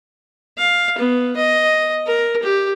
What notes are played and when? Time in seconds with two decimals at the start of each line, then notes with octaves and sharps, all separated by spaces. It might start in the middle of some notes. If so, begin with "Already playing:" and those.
0.58 F5
0.98 B3
1.36 D#5
2.07 A#4
2.43 G4